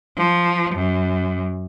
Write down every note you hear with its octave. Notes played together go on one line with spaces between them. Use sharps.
F3
F#2